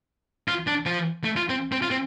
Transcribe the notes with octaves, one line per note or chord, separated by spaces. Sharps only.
F4
D4
F3
A3
F4
C4
C4
F4
C4